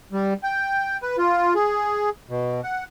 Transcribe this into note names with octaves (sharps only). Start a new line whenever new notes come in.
G3
G5
B4
F4
G#4
B2
F#5